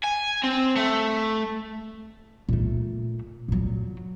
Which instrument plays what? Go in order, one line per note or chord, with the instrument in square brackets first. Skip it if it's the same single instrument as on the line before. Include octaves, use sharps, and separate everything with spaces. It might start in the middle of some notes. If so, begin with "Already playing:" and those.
[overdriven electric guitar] G#5
C4
A3
[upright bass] A#2 A3
A#2 F#3